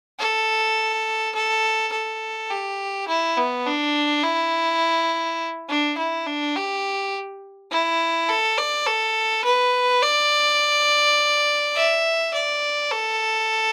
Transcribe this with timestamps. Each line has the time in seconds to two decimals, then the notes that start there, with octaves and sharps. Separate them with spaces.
0.19 A4
1.35 A4
1.92 A4
2.51 G4
3.08 E4
3.37 B3
3.66 D4
4.24 E4
5.69 D4
5.98 E4
6.26 D4
6.56 G4
7.71 E4
8.29 A4
8.58 D5
8.86 A4
9.45 B4
10.02 D5
11.75 E5
12.34 D5
12.91 A4